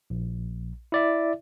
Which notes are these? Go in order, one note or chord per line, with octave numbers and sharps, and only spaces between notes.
A#1
E4 D5 E5